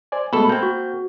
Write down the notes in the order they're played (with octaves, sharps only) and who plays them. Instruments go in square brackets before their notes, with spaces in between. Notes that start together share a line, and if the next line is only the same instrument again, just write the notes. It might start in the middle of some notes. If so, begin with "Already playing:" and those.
[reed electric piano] C5 D5 G#5
[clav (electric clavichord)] B2 A4 [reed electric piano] G#3 A3 B3 [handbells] B5
[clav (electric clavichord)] A#3 C4 [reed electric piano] G6
[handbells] F#4